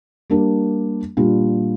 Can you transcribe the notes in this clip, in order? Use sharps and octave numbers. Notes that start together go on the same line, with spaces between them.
G3 A#3 D4
A#2 G3 D4 F4